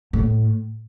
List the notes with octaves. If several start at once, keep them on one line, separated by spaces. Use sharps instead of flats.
A2